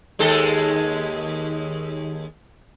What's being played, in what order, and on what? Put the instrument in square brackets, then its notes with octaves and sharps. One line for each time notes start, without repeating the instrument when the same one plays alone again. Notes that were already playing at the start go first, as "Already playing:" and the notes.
[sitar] D#2 G#3 A4